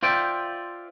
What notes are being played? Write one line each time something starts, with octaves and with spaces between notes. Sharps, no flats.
F4 C5 D5 E5 G5